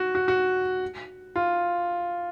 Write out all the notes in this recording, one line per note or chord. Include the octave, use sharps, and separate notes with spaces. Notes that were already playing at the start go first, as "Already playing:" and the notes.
Already playing: F#4
F#4
F#4
F4